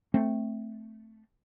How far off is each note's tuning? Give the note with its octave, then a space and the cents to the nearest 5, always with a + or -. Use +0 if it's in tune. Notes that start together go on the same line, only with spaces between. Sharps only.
A3 +0 C4 +0